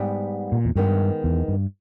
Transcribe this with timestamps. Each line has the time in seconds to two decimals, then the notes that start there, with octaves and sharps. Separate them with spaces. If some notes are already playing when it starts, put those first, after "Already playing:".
Already playing: G#2 G3 B3
0.52 A#2
0.65 E2
0.76 G2 D#3 G#3 B3
1.24 E2
1.48 G2